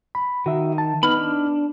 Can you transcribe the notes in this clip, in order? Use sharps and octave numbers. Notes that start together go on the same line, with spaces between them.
B5
D#3 F#4 E5
A5
B3 D#4 B5 F6
D4